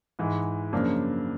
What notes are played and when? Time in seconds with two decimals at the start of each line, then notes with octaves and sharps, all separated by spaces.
0.19 G#2 E3 G#3
0.72 F#2 C#3 F3 A#3 D4